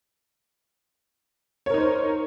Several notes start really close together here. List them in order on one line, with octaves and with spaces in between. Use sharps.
C#5 A#4 D#4 C5